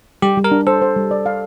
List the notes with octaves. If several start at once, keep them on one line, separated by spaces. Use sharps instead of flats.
G3 G4
G3
A#4
D4
A4 C5
C5
G3
D5
F5